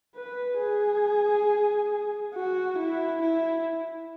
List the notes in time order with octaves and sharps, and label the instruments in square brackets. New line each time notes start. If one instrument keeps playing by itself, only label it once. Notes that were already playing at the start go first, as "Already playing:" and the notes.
[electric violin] B4
G#4
F#4
E4
E4